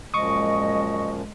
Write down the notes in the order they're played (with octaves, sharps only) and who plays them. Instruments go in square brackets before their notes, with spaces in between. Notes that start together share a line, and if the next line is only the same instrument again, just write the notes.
[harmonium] F#2 A#2 F3 [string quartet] G#3 [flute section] D#5 [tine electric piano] C#6 D#6